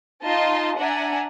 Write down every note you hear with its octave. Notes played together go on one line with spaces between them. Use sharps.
D#4 F4 D#5 A5 C6
D4 E5 F#5 G#5 A#5